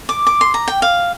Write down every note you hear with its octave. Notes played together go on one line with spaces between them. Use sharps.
D6
D6
C6
A#5
G5
F5